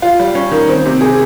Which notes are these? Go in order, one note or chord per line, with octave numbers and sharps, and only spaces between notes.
F4
G3
C#4
D#3
C4
C3
G#4